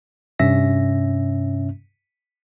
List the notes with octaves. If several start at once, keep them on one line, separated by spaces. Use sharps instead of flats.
G2 C3 C#4 E5 A#6